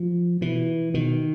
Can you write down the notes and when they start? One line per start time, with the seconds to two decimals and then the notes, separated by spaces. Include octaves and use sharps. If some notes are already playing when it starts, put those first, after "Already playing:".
Already playing: F3
0.41 B2 E3
0.94 B2 D#3